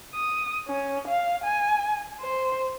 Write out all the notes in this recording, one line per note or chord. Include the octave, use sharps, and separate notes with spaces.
D#6
C#4
F5
G#5
C5